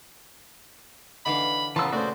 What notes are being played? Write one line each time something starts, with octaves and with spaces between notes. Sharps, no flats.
D3 E3 D4 D#4 F5 B5
A#2 C#3 E3 B3 A5 A#5 C6 E6
A3 C#4 F#4 C5 D5